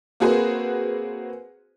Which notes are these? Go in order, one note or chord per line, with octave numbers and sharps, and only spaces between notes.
A#3 C4 F#4 G#4 B4 C5